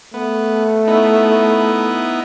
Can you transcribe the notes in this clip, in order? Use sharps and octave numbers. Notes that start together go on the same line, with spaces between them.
A3 B3
B3 D#4 E4